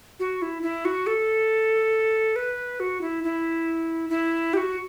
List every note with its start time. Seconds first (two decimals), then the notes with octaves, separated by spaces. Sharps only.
0.20 F#4
0.42 E4
0.62 E4
0.85 F#4
1.07 A4
2.36 B4
2.80 F#4
3.01 E4
3.24 E4
4.10 E4
4.53 G4
4.57 F#4